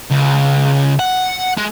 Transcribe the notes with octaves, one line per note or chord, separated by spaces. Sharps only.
C#2
F#5
G#3